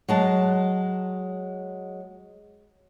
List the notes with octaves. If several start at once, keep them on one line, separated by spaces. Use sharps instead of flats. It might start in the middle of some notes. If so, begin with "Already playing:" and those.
F#3 G#3 A5